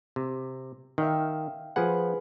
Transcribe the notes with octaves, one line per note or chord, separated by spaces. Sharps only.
C3
D#3 E5 F5 G5
F3 G#4 B4 F#5